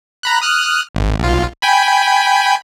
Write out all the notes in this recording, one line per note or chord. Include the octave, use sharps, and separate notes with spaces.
A#5 B5 F#6
D#6 F6 F#6
G#1
B1 F4
G5 G#5 B5